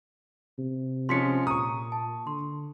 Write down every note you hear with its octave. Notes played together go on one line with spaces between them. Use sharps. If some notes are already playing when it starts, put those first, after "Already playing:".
C3
F3 G#3 C#4 C6 B6 C#7
A#2 A#5 C#6 D#6
A5
D3 C6